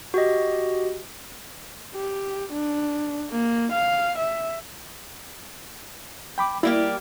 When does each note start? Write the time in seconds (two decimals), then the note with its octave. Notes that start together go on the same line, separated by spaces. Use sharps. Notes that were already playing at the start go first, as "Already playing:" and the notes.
0.14 F#4 G4 D#5
1.95 G4
2.53 D4
3.31 A#3
3.72 F5
4.18 E5
6.38 G5 B5 D6
6.63 G3 A#3 E4 G4